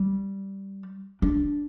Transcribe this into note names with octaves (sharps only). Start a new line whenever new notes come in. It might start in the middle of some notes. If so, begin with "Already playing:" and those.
Already playing: G3
D4